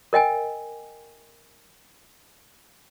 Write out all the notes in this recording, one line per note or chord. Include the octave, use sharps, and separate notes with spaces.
A#4 D#5 G5 G#5